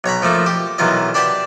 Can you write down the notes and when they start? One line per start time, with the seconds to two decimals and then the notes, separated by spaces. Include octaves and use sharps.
0.04 B1 C#5 A#5 B5
0.22 F3 A3 A#3 D#4
0.46 G4
0.78 B1 D#3 E3 F4 D#5
1.14 D4 G4 B4 F#5 A5